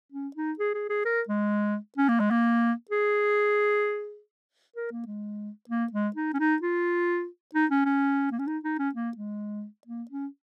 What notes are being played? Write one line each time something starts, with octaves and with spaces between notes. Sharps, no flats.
C#4
D#4
G#4
G#4
G#4
A#4
G#3
C#4
A#3
G#3
A#3
G#4
A#4
A#3
G#3
A#3
G#3
D#4
C#4
D#4
F4
D#4
C#4
C#4
A#3
C#4
D#4
D#4
C#4
A#3
G#3
A#3
C#4